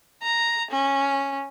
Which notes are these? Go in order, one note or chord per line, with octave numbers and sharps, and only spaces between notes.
A#5
C#4